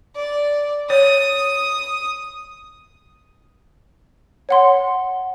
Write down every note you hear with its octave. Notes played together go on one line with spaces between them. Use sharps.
D5
C#5 D#6
C#5 F#5 C6